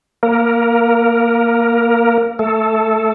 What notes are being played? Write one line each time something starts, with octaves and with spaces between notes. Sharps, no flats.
A#3 A#4
A3 A4